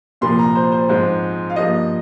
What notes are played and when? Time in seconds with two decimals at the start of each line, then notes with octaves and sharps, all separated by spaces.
0.21 C2 A#2 F3 A#3 C6
0.39 A#5
0.55 C5
0.72 C5
0.89 G#2 F3 G#3 C4 C5
1.50 F5
1.56 G2 F3 A#3 D#5